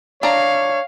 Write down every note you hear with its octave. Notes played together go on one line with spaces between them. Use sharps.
D4 C#5 F5 A#5